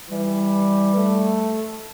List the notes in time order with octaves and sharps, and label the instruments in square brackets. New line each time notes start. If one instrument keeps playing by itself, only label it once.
[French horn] E3 [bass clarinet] G3
[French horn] A3